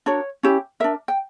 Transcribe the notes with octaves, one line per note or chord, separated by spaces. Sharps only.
D4 F#4 A#4 C#5
C#4 E4 G4
D4 A#4 E5
G5